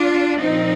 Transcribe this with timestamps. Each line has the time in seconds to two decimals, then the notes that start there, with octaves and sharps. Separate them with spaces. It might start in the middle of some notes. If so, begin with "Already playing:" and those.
Already playing: D4 F4
0.40 A#2 F3 C4 D#4